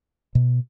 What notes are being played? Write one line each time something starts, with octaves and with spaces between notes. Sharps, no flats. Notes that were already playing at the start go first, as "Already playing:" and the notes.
B2